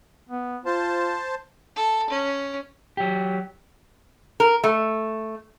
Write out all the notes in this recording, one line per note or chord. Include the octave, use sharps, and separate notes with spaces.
B3
F4 C5 A5
A4
C#4
F#3 G4
A#4
A3